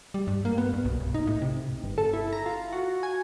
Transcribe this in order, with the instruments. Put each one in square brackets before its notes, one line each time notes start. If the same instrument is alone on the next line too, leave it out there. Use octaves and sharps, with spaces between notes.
[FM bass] G3
G2
A#3
B3
G2
B1
B1
D#4
A2
C3
[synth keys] G1
A4
E4
A#5
F4
F#4
G#5